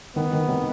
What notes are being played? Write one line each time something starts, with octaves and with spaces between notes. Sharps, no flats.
D#3 B3
D#3
C3